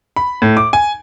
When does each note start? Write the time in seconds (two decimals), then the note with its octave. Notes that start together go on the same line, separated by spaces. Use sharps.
0.16 B5
0.42 A2
0.57 D6
0.73 G#5